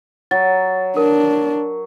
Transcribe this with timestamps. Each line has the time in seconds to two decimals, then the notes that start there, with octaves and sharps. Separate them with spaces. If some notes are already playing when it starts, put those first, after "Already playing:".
0.31 F#3 A6
0.97 D4 A#4